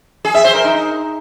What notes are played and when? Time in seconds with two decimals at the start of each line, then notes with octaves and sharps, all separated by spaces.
0.25 G#4
0.35 E5
0.44 C5
0.54 A#4
0.64 D#4